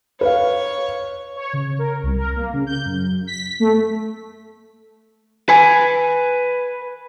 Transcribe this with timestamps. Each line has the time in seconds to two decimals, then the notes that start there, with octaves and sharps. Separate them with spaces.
0.21 B4 C#5 F5
1.36 C#5
1.53 C#3
1.79 A#4
2.03 C2
2.18 A#4
2.36 A#3
2.53 C#3
2.67 G6
2.85 F#2
3.27 B6
3.60 A3
5.49 B4 G#5